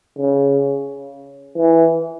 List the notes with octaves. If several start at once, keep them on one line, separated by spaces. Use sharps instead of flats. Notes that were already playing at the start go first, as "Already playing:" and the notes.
C#3
E3